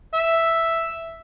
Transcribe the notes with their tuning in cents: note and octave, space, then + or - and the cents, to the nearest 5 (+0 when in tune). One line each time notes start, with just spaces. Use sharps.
E5 +0